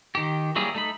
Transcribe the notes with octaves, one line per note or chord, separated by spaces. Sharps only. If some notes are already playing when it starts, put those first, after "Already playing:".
D#3 G4
F#3 G3 A#3 E4 G#4
A3 D#4 B5